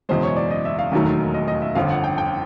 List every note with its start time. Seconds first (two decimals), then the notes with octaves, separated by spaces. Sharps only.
0.09 F#1 E2 B2 G#3 C5
0.23 C#5
0.36 D5
0.51 D#5
0.65 E5
0.79 F5
0.92 E1 D#2 D#3 F#3 A3
1.34 D#5
1.48 D#5
1.62 E5
1.75 G1 F2 D3 F3 F5
1.90 F#5
2.04 G5
2.18 G5